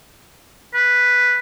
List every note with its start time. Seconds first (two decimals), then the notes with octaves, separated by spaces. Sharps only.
0.74 B4